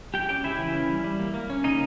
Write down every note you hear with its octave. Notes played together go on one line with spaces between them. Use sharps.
G#3 G4 G5
C#4 G4 G5
C#3 E4 E5
E3
C#4
G3
G3
A#3
A#3
C#4
C#3 D#4 D#5